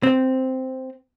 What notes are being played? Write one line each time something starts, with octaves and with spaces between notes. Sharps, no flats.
C4